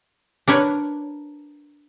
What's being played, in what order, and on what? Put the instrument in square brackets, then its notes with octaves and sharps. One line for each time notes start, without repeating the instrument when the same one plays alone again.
[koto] D4 A#4 B4 C#5